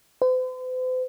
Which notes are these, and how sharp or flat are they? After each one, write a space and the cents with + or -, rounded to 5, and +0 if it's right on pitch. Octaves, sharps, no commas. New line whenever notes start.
C5 -45